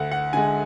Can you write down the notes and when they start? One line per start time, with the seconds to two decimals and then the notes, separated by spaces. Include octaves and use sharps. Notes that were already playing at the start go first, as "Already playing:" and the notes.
Already playing: D2 F#5
0.11 F#5
0.33 D3 G#3 G#5